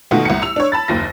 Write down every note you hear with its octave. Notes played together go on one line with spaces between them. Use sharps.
B2 D#3 A3 F4 F#5
C2 F#5 C#7
E6 F7
D4 C#5
A5 B5 A6
F#1 D#2 F4 A#6